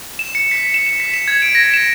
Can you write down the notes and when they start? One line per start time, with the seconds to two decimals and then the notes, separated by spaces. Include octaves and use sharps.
0.19 E7
0.35 C#7
0.51 B6
0.74 E7
0.86 E7
1.00 B6
1.14 E7
1.28 G#6
1.42 D7
1.55 A#6
1.74 E7